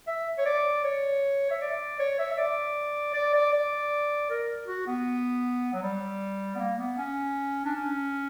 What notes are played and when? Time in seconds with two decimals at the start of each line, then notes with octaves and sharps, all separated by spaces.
0.07 E5
0.38 C#5
0.46 D5
0.84 C#5
1.51 E5
1.62 D5
2.00 C#5
2.19 E5
2.31 E5
2.38 D5
3.14 D5
3.33 D5
3.53 D5
4.30 A#4
4.68 F#4
4.87 B3
5.74 F#3
5.83 G3
6.55 B3
6.59 A#3
6.79 B3
6.98 C#4
7.65 D4
7.76 C#4